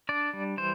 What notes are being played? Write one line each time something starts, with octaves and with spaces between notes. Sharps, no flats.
D4 D5
G3
E3 C5